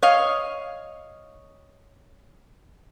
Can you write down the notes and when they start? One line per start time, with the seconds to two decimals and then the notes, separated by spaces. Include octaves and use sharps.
0.02 C#5 D#5 F5